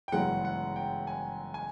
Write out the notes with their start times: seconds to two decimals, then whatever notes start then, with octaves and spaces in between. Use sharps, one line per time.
0.08 G5
0.12 G1 F#2 C#3 E3 G#3 F#5
0.45 F#5
0.76 G5
1.07 G#5
1.54 G#5